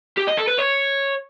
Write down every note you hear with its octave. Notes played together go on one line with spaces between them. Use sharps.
G4
D#5
A4
B4
C#5